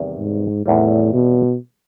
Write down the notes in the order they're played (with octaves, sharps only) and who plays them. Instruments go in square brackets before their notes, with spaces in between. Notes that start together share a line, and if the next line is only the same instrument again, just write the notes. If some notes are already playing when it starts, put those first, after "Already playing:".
Already playing: [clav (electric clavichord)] E2 C3 D#3 G3
[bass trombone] G#2
[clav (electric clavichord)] E2 C3 D#3 G3 [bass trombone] A2
[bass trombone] B2